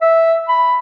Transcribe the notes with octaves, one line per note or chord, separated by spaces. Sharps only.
E5
B5